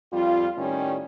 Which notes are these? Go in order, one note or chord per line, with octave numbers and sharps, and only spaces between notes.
F2 G3 F4
A2 D#3 G3 C#4